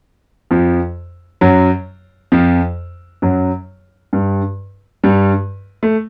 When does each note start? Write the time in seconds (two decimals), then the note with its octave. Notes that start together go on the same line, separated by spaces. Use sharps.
0.51 F2 F3
1.41 F#2 F#3
2.32 F2 F3
3.22 F#2 F#3
4.13 G2 G3
5.04 G2 G3
5.83 A3